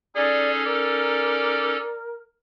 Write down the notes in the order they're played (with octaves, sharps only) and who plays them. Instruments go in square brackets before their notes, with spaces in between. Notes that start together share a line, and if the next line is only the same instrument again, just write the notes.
[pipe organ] C#4 D#4 A4 [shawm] G#4 [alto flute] D5
[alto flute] A#4 [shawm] D5